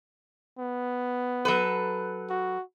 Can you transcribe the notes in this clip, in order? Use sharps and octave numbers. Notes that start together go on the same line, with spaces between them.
B3
F#3 A4 B4
F#4